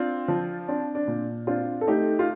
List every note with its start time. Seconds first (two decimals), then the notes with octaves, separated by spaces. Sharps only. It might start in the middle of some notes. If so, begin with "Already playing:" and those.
Already playing: C4 D4 F4
0.28 F3
0.68 C4 D4
0.95 D4
1.08 A#2
1.47 C4 D4 F4
1.81 A4
1.87 A3 D#4 G4
2.19 F4